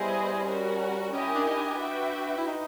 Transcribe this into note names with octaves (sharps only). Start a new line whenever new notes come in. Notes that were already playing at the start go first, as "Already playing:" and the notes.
Already playing: G3 B3 E4 G#4 C5 D#5
C#4 F#4 A#4
C#4 E4 G4 A#4 D#5 G#5
D4
D#4
D4
F#4 B4 E5 G5
E4
D#4